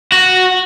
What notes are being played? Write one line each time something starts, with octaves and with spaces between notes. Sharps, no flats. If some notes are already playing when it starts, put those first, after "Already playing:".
F#4